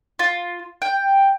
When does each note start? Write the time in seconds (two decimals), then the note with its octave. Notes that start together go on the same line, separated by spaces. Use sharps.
0.19 F4
0.82 G5